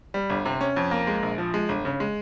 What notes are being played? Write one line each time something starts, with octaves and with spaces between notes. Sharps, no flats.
G3
G1
C3
C#4
F2
A#3
G#3
A#1
F3
G#3
G1
C#3
G#3